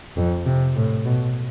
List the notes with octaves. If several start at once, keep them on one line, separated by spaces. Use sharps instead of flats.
F2
C3
A2
B2